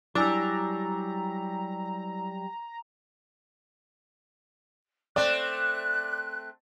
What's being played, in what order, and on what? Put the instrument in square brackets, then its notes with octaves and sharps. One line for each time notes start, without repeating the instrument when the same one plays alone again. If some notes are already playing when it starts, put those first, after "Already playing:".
[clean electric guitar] F#3 G3 [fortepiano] D4 [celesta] E4 G#5 E6 [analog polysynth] A#5
[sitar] A3 C4 [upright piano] D5 [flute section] F#6